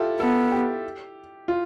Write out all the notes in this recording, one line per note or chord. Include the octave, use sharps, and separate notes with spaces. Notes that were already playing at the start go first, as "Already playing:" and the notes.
Already playing: E4 F4 G4 A4
B3 A4
G4
F4